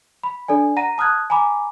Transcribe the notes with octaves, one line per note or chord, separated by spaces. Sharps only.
B5
D4 A4 D5 G#5
F#5 A#5 A#6 D#7
A5 D#6 F6 F#6 G#6
G#5 A#5 B5 D6